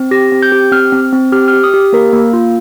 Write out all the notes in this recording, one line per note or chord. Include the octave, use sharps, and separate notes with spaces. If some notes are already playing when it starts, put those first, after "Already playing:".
Already playing: C4
G4 A#6
C4
G6
G4
C4 F6
C4
C4
G4 F6
F6
G4
D#6
G4
A#3 A#4
A#3
F4